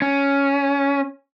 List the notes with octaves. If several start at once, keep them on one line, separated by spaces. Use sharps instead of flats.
C#4